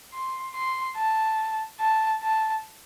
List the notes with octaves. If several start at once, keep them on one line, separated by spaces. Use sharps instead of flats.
C6
C6
A5
A5
A5